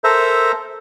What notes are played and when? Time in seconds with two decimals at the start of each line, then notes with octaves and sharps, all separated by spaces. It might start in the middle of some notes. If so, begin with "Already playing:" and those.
0.04 A4 A#4 C5 E5 A#5